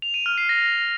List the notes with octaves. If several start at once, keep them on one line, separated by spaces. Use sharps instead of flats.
F7
D#7
F6
C7
A#6